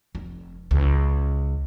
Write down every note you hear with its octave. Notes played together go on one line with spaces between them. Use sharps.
F1
C#2